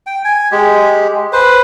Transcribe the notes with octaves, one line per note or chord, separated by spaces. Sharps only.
G5
G#5
G#3 G4
B4 C5